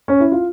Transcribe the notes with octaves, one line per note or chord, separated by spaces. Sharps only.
C#4
E4
F4